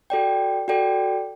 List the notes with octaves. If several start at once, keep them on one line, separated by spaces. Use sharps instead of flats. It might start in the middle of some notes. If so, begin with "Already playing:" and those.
F#4 A4 D5 G5
F#4 A4 D5 G5